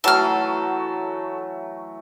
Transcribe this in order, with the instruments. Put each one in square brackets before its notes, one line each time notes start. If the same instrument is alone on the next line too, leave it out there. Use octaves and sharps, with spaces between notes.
[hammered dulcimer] E3 F#3 A3 [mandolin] A4 F6